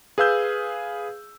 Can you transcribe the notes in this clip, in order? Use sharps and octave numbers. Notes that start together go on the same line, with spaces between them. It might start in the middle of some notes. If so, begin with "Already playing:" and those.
G#4 B4 F5 E6 G6